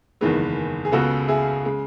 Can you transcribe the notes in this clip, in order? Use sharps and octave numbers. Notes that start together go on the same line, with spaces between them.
F#1 E2 D#3 G#3 B3
G#4
C#2 C#3 G#3 B3 F#4 A4
E4 G#4
C#3 G#3